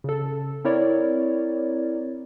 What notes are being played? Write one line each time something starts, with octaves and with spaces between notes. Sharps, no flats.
C#3 A4
C4 E4 A#4 C#5 D5